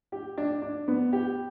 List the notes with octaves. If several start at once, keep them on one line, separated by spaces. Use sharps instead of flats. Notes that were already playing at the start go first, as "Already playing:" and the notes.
G4
D4
D4
B3
G4